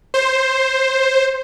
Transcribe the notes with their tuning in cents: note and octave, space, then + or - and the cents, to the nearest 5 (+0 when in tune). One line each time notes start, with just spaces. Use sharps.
C5 +10